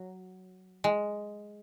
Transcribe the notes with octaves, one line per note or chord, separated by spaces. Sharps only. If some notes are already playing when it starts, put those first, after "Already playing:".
Already playing: F#3
G#3